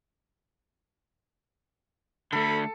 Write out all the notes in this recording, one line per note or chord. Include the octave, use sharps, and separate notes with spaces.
D3 A3 A4 B5